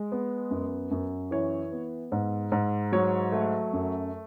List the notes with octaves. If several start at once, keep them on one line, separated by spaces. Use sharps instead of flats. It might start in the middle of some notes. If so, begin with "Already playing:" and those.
Already playing: G#3
B3
F#2
F#2
E3 C#5
B3
G#2
G#2
F#3 C#5
A3
F#2